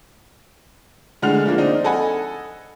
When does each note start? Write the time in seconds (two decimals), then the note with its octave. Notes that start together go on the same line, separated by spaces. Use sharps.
1.22 D3 G#3 A3 F#5 F6 F7
1.46 D3 F3 A#3
1.58 C4 D4 D#4
1.84 A4 D#5 F#5 G#5 B5